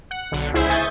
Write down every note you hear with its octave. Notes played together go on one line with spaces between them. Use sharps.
F#5
B1 D3
C#2 E4 G#4 C5 E5
G#5 C#6 D#6 G6 A6